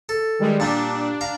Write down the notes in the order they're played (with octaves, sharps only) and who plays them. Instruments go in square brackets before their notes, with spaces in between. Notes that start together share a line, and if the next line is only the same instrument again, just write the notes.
[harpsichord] A4
[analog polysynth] D#3 G3 G#3
[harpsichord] A#2 G3 [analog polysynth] D4
[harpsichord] F5 A#5